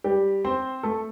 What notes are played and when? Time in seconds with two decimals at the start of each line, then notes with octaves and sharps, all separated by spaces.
0.04 G3 G4
0.45 C4 C5
0.83 A3 A4